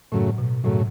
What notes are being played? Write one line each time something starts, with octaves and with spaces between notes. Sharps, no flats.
F#2 A2 C#3 F#3 A3
B2
F#2 A2 C#3 F#3 A3